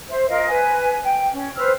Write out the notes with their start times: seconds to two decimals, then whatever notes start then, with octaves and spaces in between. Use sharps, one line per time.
0.10 C5 E5
0.28 F4 A#4 D#5 F5
0.48 B4 G#5
1.04 G5
1.33 C#4
1.56 B4 C5 E6 F6